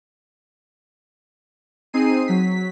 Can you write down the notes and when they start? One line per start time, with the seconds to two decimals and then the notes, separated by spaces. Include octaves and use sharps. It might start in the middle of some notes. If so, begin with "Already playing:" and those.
1.93 C4 D#4 G#4 C7 D#7
2.28 F#3 B6